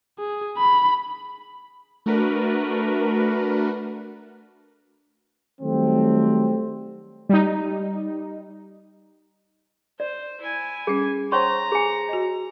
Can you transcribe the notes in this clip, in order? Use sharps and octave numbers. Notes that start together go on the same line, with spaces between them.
G#4
B5
A3 D4 F#4 A#4 B4
D#3 F#3 G3 A3 C4
G3 D#4
C5 D5
E4 G#5
G3 C#4 G#4
C5 C#5 F#5 G5 A#5 C6 C#6
G#4 G#5
F#4 D#5